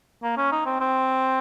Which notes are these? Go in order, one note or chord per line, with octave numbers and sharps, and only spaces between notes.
A#3
C#4
D#4
C4
C4